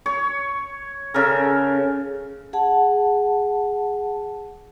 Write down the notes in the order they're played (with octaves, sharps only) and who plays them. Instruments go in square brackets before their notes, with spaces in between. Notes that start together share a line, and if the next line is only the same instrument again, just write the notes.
[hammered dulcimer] C#5
C#3 A4 A#4
[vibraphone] G#4 F#5 A5